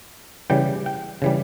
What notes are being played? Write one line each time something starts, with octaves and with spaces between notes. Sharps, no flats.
C#3 E3 G3 G5
G5
C#3 E3 G3